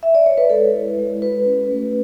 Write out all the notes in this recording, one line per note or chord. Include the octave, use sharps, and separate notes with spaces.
E5
D5
C#5
B4
G#3 A4
E4
G#3
F#4 B4
C#4
A3